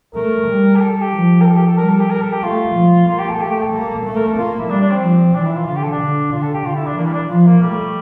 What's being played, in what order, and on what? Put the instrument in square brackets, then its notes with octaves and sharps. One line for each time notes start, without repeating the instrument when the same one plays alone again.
[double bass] A3 [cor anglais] A#4
[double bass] G3
[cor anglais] G4
A4
A4
G4
[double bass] F3
[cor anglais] A#4
A4
G4
A4
[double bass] G3 [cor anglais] A#4
[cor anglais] A4
G4
A#4
A4
G4
[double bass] A3 [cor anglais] F4
[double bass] F3
[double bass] A#3 [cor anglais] F4
[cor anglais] G4
A4
[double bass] A3 [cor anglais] G4
[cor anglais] G4
A4
[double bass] A#3
A3
[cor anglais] A#4
A4
[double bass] A#3 [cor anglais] F4
[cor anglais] E4
[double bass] G3 [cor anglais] D4
[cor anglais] D4
C4
[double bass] F3
[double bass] E3 [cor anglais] D4
[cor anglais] E4
F4
[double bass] D3 [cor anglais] F4
[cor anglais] G4
A4
D4
[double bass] D3
[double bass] D3 [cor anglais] F4
[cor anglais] A4
G4
[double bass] D3 [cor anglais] F4
[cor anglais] E4
D4
[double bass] E3 [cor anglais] A#3
[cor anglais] G3
D4
[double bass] F3 [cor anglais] F4
[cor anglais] A#3
[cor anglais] G3 [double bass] A3